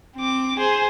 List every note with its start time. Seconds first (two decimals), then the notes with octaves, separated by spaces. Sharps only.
0.16 C4 D6
0.58 G#4 C5